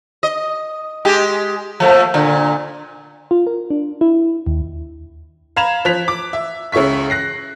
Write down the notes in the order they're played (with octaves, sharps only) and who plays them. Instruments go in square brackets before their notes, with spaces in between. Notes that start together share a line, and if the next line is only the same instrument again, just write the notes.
[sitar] D#5
G#3 G4
F3 A3 A#3
A#2 D3
[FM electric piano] F4
A#4
D4
E4
D#2
[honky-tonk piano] F5 A#5 B5 G#6 E7 F7
F3 F#6 B6 F7
D6
E5
C#2 C#3 E5 C#6 B6
F#6 A#6 C7